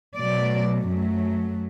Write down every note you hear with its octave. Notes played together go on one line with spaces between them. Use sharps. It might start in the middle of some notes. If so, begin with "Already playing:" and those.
B2 F#3 A3 D5
F#2 F#3 A3